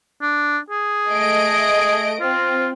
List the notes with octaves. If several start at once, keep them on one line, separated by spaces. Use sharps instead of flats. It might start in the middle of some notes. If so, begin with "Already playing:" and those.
D4
G#4
A3 D#5 D7
C4 F4